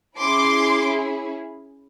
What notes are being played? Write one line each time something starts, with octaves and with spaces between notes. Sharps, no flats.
C#4 E4 G#4 C6 D6